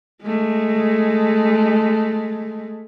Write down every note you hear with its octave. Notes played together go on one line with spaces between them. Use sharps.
G#3 A3